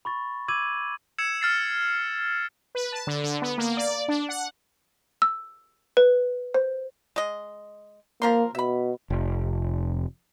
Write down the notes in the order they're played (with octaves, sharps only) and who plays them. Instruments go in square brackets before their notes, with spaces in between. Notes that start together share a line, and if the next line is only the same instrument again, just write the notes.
[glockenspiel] B5 C#6 A6
D6 E6 G#6 D#7 F#7
[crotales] E6 G#6 C#7 E7
F6 A6 C7
[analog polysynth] B4
A5
D3
D3
B3
A#3
D5
D4
F#5
[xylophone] E6
B4
C5
[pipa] G#3 D#5
[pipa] F3 A#4 C6 [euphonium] A#3
[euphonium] B2 [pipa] E5 B5
[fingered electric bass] F1